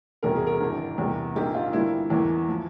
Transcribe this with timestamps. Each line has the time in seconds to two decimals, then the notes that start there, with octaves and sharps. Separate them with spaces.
0.23 E1 E2 C3 G3 A#4
0.35 G#4
0.47 A#4
0.60 G#1 G2 E3
0.98 E2 C3 G3 A#3
1.35 A#1 G#2 G3 A#3 G4
1.55 F4
1.73 G1 G2 G3 A#3 E4
2.10 E2 E3 A#3
2.48 F3